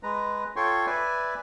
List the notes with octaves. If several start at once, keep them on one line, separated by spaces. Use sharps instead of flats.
G#3 B4 A#5
F4 A4 C#5 G5 C6 C#6
B4 D5 E5 G#5